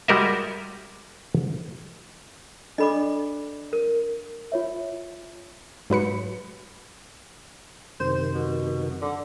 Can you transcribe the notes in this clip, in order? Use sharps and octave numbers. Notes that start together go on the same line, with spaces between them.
G3 G#3 F#4 A#4 D#5 E5
D4 A4 D5 D#5 B5 D6
A#4
F4 C#5 E5
G#2 F#3 B4 C#7
F#2 C3 D#3 C5
B2
D3